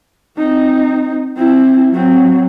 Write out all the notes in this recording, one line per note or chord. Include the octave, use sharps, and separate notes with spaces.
C4 D#4
C4 E4
F#3 C4